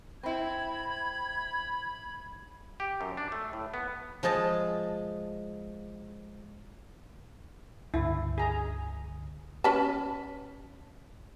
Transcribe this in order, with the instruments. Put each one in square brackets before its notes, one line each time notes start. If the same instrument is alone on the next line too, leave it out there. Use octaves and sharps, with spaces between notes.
[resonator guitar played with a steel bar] C4 E4 [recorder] B5 [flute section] G#6
[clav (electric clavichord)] G4
F#2
D4
A3
A2
B3
[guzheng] F3 G#3 D#5 A5
[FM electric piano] C#2 G2 D3 [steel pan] E4
[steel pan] G#4 A#5
[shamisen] C#4 B4 A5